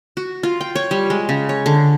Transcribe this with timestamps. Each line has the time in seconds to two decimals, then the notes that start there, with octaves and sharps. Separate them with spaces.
0.17 F#4
0.43 F4
0.61 G5
0.75 C#5
0.91 G3
1.10 G#3
1.29 C#3
1.49 C#5
1.66 D3